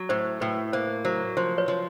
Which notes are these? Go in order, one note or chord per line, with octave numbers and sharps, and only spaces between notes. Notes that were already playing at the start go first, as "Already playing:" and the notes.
Already playing: F#3
A2 C5
A2 B4
A#3 C5
F#3 C5
F3 C5
B4 C#5
F3